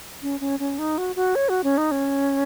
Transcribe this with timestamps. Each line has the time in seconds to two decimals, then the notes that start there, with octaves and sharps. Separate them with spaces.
0.22 C#4
0.40 C#4
0.59 C#4
0.78 D#4
0.98 F#4
1.16 F#4
1.35 C#5
1.49 F#4
1.64 C#4
1.77 D#4
1.91 C#4